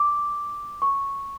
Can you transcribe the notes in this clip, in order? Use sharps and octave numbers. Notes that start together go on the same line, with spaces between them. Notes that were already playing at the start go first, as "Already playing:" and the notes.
Already playing: D6
C#6